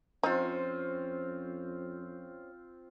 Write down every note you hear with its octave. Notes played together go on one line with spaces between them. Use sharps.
F2 C4 C#4 D#4 F4 C5